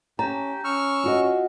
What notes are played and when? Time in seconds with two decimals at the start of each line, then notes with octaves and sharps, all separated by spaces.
0.19 C#4 G4 A5 A#5
0.64 C#4 C#6 E6 F6
1.04 F4 F#4 D#5